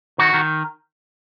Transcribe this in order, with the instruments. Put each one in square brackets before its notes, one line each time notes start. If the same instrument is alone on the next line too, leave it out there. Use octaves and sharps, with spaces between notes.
[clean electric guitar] D#3 F#4
D#3